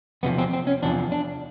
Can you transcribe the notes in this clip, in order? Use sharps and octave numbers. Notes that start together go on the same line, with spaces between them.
E2 C3 F3 B3
C4
C4
C#4
E2 C3 F3 D4
D4